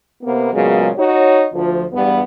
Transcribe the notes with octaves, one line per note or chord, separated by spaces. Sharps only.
C3 A#3 B3
A#2 C#3 F#3 G#3 B3
D#4 F#4 C#5
D2 F3
E2 G2 G3 B3